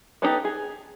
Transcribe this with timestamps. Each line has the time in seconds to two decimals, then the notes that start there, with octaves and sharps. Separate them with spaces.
0.22 B3 D4 D#4 G4 A4
0.45 G#4